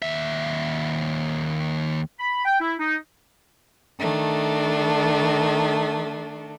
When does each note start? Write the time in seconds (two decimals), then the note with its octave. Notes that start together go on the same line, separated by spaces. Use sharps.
0.02 D#2 E5
2.20 B5
2.45 G5
2.60 E4
2.80 D#4
3.99 D#3 A3 D4